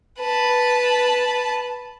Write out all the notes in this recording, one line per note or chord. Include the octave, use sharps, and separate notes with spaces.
B4 A5